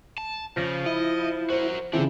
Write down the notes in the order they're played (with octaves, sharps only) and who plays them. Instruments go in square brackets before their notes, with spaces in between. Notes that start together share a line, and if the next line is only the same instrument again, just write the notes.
[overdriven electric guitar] A5
[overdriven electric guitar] C#3 [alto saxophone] F3 [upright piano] A#6
[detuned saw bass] E4 [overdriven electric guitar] D#5
[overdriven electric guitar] F#4 A#4 [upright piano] C5
[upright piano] C#3 E3 [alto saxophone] C4 [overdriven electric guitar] D4 A4